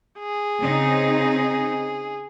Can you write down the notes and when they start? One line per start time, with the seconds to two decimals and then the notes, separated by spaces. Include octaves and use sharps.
0.19 G#4
0.59 C#3 C4 D#4